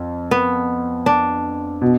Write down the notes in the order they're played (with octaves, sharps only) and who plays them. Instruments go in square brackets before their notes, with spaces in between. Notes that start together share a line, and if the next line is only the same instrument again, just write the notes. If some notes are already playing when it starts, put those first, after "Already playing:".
Already playing: [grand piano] F2
[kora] B3
D4
[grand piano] B2